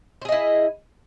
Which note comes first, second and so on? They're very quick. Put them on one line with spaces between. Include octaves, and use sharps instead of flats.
C5 G#4 D#5 E4